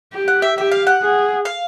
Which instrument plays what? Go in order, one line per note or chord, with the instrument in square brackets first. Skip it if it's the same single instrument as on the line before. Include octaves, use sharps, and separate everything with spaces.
[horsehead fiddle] G4
[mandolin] F#5
E5
[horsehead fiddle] G4 [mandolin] E5
[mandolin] F5
F#5
[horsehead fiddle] G#4
[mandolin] F5